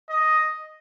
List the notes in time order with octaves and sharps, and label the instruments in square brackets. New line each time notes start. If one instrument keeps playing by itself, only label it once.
[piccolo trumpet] D#5